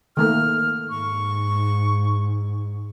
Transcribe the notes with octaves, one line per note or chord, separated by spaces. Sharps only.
D#3 A3 A#3 F6
G#2 C#6